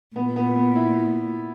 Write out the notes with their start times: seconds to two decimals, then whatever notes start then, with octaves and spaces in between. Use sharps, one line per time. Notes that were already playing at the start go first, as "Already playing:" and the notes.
0.16 A#2 B3
0.36 B3
0.55 B3
0.75 E4